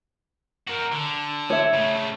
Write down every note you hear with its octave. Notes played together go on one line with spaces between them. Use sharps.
F#4 A#4
D3
C#5 E5
C#3 A3